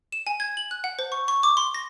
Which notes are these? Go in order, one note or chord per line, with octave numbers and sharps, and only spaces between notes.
E7
G#5
G#6
F#7
F#6
F#5
C5
C#6
C#6
D6
C6
A#6